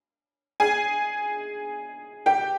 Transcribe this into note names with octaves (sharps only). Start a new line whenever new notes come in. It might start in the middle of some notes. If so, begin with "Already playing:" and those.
G#4 G#5
G4 G5